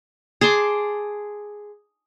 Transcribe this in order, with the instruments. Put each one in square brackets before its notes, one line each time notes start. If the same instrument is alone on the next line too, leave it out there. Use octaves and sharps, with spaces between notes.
[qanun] G#4 A5 C6 D6